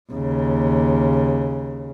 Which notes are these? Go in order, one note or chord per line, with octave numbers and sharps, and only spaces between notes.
D#2 C#3